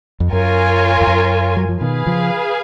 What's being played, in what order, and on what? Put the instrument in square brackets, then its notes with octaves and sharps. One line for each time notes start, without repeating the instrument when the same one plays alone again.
[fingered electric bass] F2
[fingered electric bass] F#2 [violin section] F4 A#4 C#5 G#5
[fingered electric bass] F2
F#2
F#3
F3
[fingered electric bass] B2 D#3 [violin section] G#4 B4 F5
[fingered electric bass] C#3 F3